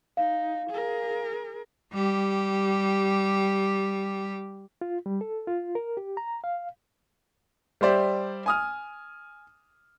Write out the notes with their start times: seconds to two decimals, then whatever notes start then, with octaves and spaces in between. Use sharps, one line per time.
0.17 D#4 F5
0.70 G#4 A#4
1.93 G3 G4
4.81 F4
5.06 G3
5.21 A4
5.47 F4
5.75 A#4
5.97 G4
6.17 A#5
6.44 F5
7.81 G3 G4 C5 D5 E5
8.46 G#5 D#6 F6